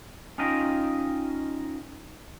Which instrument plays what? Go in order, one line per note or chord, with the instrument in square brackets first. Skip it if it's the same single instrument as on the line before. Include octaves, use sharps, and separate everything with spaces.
[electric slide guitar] C#4 D#4 F4 D#5 G5